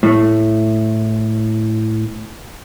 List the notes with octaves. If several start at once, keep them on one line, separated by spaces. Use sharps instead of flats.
A2 A3